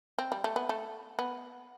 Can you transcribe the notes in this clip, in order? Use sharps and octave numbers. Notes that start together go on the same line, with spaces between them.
C4
G3
A3
B3
A3
B3